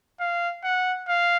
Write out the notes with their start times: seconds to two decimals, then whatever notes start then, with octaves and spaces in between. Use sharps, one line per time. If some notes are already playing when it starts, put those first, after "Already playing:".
0.20 F5
0.64 F#5
1.08 F5